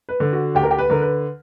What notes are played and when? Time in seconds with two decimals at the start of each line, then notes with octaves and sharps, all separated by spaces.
0.09 B4
0.20 D3
0.33 F#4
0.55 D2 G4
0.63 A#4
0.71 G4
0.79 B4
0.90 D3 A#4
1.01 B4